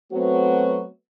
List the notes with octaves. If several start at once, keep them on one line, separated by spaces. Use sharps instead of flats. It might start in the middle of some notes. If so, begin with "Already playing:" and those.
F#3 A3 B3 C4 F#4